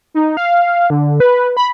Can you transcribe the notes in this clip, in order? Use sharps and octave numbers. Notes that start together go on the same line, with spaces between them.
D#4
F5
D3
B4
B5